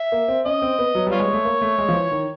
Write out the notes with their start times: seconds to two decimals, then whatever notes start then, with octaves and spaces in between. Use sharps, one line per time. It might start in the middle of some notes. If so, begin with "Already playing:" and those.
Already playing: E5
0.12 A#3
0.28 C4
0.45 C#4 D#5
0.62 C4
0.79 B3
0.95 F#3
1.07 G3 F4 C#5
1.20 G#3
1.33 A3
1.45 A#3
1.61 A3
1.78 G#3
1.89 F3
1.94 E3
2.12 D#3